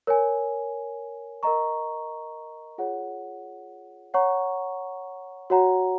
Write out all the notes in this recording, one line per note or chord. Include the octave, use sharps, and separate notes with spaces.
A#4 C#5 G#5
A#4 D#5 A#5 C#6
F4 G#4 C#5 F#5
C#5 F#5 A#5 C#6
F#4 C#5 F#5 A#5